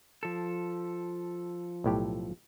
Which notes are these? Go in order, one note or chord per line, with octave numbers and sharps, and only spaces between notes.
F3 A4
B1 A2 G4